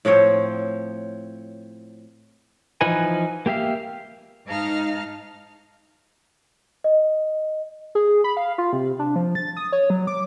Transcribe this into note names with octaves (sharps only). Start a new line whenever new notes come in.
A2 F3 C4 C#5
E3 F3 D#4 B4 G#5
A#3 G4 E5 F5
G#2 D#4 D#5 F5 A5 F6
D#5
G#4
B5
F5
F4
C3
D4
F3
A6
D#6
C#5
F#3
D6